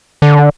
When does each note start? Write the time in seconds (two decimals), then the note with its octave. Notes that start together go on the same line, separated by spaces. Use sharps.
0.22 D3